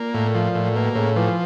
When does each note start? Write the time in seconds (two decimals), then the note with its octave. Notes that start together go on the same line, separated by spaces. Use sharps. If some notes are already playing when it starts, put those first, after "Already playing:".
Already playing: A#2 A#3
0.14 A2
0.35 F3
0.55 A2
0.75 B2 A#3
0.95 A2 C#3
1.16 E3 F3